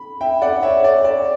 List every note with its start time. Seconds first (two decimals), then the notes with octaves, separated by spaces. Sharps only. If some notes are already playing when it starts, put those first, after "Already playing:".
Already playing: B5
0.21 E5 G5
0.42 D5 F#5
0.63 C#5 E5
0.84 D5
1.05 D5